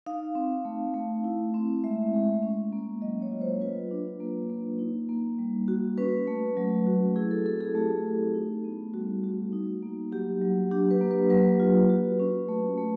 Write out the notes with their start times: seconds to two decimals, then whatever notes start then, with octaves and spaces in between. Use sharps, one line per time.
0.06 D#4 F5
0.35 C4
0.65 A3
0.94 A3
1.24 E4
1.54 C4
1.84 G#3 E5
2.13 G#3
2.43 C#4
2.73 A#3
3.01 F#3 D#5
3.22 C#5
3.31 F4
3.41 C5
3.61 F4 B4
3.91 D4
4.20 A#3
4.50 A#3
4.79 D#4
5.09 A#3
5.39 G3
5.68 F#4
5.98 C#4 B4
6.27 A3
6.57 F#3
6.86 F#4
7.16 E4 G#4
7.31 A4
7.46 C4 A4
7.61 G#4
7.75 A3 G4
8.05 A3
8.34 D#4
8.64 B3
8.94 G3 F#4
9.24 F#4
9.53 D#4
9.83 A#3
10.12 F#3 G4
10.42 F#3
10.71 D4 G4
10.91 B4
11.01 A#3
11.11 B4
11.30 F#3 B4
11.60 F4
11.89 F#4
12.19 C#4
12.49 A3
12.78 A3